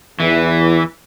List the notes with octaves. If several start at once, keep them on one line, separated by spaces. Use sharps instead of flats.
E2 E3